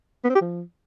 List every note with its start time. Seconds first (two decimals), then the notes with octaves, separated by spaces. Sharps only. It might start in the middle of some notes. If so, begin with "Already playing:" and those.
0.24 B3
0.30 C4
0.35 G4
0.40 F3